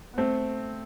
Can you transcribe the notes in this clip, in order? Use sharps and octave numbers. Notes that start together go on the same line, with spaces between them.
B3
A3 C4